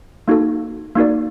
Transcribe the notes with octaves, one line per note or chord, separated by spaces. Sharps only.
A#3 D#4 F#4 A4
A#3 D#4 F#4 A#4 D5